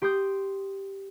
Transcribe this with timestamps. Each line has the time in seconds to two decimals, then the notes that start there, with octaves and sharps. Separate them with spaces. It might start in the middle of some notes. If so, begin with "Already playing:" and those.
0.02 G4 C6 D#6 G6